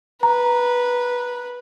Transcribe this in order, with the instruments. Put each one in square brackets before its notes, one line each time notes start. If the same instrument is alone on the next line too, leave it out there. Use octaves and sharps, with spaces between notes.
[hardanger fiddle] B4 [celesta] A#5